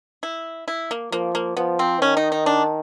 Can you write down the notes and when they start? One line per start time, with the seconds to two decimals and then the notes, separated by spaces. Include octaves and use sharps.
0.23 E4
0.68 E4
0.91 A#3
1.12 F3 A#3
1.35 A#3
1.57 F3 B3
1.79 C4
2.01 D#3 C#4
2.17 D#4
2.32 D#4
2.46 D4